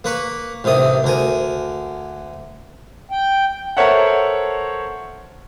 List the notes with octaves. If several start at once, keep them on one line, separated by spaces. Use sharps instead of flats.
A#3 B4 C#6
A1 C3 D#3 D#6
D2 A#4 G#5
G5
A4 A#4 C5 C#5 E5 F#5